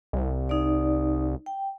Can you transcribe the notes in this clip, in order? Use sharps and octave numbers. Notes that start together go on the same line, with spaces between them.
C2
D#4 D5
G5